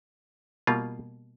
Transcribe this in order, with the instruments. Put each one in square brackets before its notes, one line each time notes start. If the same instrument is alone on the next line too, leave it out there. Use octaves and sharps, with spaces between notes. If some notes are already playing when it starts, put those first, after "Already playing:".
[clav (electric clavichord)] B2 G3 A#3 F4